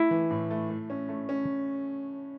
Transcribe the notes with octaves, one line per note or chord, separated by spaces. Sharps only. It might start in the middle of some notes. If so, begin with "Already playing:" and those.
Already playing: A3 E4
E3
A2
A3
A3
C#4
A3
C#4